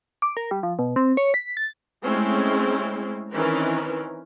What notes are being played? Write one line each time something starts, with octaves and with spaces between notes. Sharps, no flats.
D6
A#4
G3
F3
B2
C4
C#5
B6
A6
G#3 A3 C4 C#4 E4
D#3 E3 C4 C#4 A#4 B4